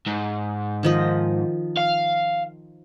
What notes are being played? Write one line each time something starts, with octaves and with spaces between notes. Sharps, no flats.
G#2
D#3 F3 D#5
F5